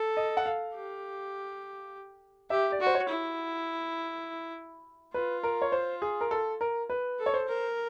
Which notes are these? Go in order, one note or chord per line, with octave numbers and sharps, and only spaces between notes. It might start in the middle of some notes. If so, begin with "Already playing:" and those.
Already playing: A4
D#5
F#5
F5
G4
G4 E5
D5
F#4
C5
C#5
E4
F4 B4
A#4
C#5
C5
G#4
A#4
A4
A#4
B4
A4
C#5
C5
A#4